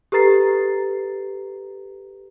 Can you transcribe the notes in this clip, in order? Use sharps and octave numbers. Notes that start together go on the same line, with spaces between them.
G4 A4 B4 A#5 A6 C7